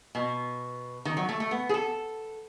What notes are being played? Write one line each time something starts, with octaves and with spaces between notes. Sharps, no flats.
B2
D#3
F#3
A3
A3
B3
G#4
A4